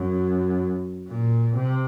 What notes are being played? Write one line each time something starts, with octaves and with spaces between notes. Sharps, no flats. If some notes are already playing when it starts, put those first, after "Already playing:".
Already playing: F#2
A#2
C3